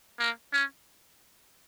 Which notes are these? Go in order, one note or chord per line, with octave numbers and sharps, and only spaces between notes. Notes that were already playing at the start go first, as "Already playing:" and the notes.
A#3
C#4